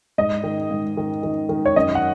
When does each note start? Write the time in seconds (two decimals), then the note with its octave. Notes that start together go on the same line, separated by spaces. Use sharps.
0.18 G#2 D#5
0.44 D#3
0.71 G#2
0.97 D#3
1.23 D#3
1.49 D#3
1.66 C#5
1.76 F#2 D#5
1.95 F#5